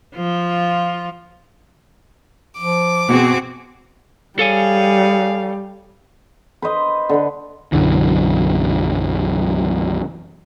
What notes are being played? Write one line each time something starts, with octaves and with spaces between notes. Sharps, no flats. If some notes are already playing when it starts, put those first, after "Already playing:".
F3 F4
F3 D6
B2 C4 F#4 G#4
G3 G#4 A4 C#5 F5 G#5
B4 C5 D#5
D3 B4
B1 F#2 D3 E3